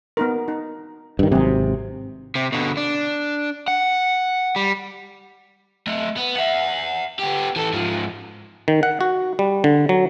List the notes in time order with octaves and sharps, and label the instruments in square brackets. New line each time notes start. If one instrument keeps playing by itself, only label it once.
[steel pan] B3 D#4 A#4
D#4
[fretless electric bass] G2 D#3
[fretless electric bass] G#1 C3 [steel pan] F#3 C4 G#4
[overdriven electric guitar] C3
B2 D3
D4
F#5
G3
A3 D#5
B3
E5 F#5
B3 G4
E3 A4
G#2 F3
[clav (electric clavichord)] D#3
F#5
F#4
G3
D3
F#3